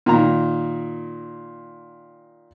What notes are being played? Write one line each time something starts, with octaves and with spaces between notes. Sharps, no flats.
A#2 D#3 A#5